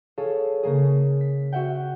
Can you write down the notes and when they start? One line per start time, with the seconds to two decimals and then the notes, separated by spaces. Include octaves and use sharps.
0.18 G#4 A4 C#5 F5
0.63 C#3 A#3 G#4
1.21 B6
1.52 F#4 E5 F#5 G5